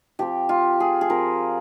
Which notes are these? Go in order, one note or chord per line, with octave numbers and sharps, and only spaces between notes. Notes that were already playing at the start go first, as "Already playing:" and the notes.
F3 C4 G4
F4
G#4
G#4
F3 C4 A#4